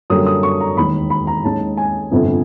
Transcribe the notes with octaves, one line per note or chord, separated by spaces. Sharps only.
F#2 D3 G3 A#3 D#6
D#6
C#6
A#5
E1 D#2 D#3 B5
B5
A#5
D#2 D#3 G#3 C#4 A5
G#5
G1 F2 C3